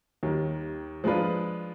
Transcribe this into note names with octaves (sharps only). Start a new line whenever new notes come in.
D#2 D#3 G3
F3 G#3 D4 F4 B4